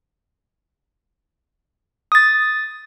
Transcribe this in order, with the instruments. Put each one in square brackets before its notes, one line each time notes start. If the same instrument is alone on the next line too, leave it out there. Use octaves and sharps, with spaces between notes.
[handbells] D#6 A6